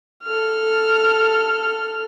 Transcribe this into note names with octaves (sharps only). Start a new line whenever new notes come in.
A4 F6